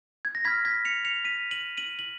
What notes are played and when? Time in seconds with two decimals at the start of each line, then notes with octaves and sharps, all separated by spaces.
0.25 G#6
0.35 A#6
0.45 B5 F6 G#6 B6
0.65 G#6 B6
0.85 C#7 F7
1.05 C#7 F7
1.25 B6 D#7
1.51 D#7 F#7
1.77 D#7 F#7
1.99 F#7